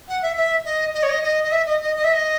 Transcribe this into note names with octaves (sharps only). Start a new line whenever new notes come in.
F#5
E5
E5
D#5
D#5
C#5
D#5
D#5
D#5
E5
D#5
D#5
D#5
E5
D#5